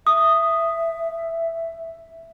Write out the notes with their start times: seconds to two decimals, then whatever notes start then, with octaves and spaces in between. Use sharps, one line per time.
0.07 E5 D#6